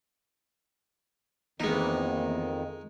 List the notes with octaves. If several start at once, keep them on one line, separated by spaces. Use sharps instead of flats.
F2 D#3 E3 G#3 A#3 B3 D#4